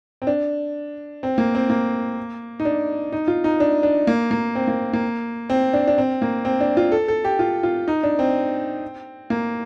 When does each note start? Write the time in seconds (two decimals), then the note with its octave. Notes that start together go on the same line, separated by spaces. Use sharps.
0.22 C4
0.27 D4
1.23 C4
1.38 A#3
1.55 C4
1.70 A#3
2.60 D#4
2.65 D4
3.12 D#4
3.28 F4
3.44 D#4
3.60 D4
3.83 D4
4.07 A#3
4.31 A#3
4.55 C4
4.68 A#3
4.93 A#3
5.50 C4
5.73 D4
5.88 D4
5.98 C4
6.22 A#3
6.45 C4
6.60 D4
6.77 F4
6.92 A4
7.08 A4
7.25 G4
7.39 F4
7.63 F4
7.88 D#4
8.03 D4
8.19 C4
9.30 A#3